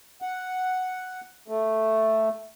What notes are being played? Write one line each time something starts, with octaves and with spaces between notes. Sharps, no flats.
F#5
A3